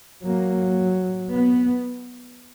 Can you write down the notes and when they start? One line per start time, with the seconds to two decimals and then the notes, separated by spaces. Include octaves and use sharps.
0.24 F#3 A#3
1.34 B3